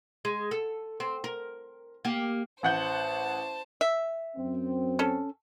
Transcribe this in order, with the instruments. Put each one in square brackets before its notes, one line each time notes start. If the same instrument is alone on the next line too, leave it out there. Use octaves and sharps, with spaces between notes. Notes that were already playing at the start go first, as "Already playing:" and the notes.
[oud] G#3
A4
C4
A#4
A#3 G4
[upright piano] A1 F#5 G6 [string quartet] C5 A5
[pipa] E5
[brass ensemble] F#2 C4
[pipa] C#4 A4